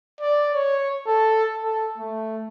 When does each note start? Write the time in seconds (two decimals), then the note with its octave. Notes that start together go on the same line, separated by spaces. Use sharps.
0.21 D5
0.54 C#5
1.07 A4
1.64 A4
1.98 A3